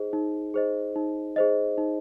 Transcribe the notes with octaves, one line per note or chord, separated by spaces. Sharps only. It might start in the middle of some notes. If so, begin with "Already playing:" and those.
Already playing: D#4 G#4 C5 D#5
D#4
G#4 C5 D#5
D#4
G#4 C5 D#5
D#4